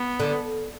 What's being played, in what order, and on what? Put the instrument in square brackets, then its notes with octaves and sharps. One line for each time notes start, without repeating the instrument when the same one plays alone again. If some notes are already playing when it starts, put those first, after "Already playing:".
Already playing: [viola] B3
[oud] D3